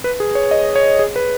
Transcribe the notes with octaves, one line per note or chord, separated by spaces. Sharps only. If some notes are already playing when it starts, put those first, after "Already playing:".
B4
G#4
C#5
D#5
C#5
G#4
B4